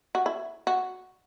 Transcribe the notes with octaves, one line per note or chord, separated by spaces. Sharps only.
F#4
E4
F#4